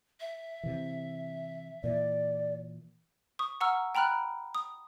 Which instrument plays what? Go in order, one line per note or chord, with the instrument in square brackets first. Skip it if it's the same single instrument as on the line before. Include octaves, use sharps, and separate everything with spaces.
[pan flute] E5
[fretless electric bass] C3 E3
[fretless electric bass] A#2 E3 [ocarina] D5
[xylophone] C#6 D#6
F#5 A#5 C#6 E6 F6
G5 A#5 B5 F6 F#6
D#6